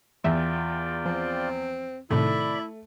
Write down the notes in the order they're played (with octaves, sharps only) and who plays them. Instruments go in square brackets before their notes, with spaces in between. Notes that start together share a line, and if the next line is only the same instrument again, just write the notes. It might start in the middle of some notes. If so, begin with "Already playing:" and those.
[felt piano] E2 [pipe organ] F4 D5 G5 [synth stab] E5
[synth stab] F3 [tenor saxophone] C4
[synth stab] A2 C3 D#3 [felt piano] A3 [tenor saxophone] E4 [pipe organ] D5 B5